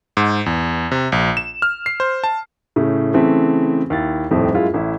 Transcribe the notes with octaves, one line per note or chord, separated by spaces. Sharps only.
G#2
E2
C3
A#1
E7
F6
C7
C5
A5
A2 C#3
C#3 E3 A3 C4
D#2 E4 A6
D#1 F2 A2 C4
F#2 G#3 E4 F4
A1 E4